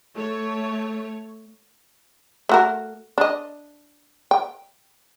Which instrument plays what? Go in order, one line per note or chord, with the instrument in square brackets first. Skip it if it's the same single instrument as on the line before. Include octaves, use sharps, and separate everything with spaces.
[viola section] A3 C#5
[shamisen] A3 F#4 A#4
D4 D#5
G5